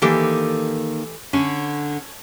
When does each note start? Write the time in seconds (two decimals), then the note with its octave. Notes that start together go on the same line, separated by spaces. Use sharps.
0.02 D#3 E3 A#3 G4 A4
1.33 D3 C#4